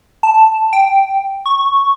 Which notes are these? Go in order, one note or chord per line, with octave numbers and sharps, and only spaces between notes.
A5
G5
C#6